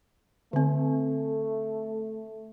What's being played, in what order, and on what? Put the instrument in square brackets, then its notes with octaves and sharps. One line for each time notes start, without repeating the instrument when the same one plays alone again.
[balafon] D3 C4 [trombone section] A3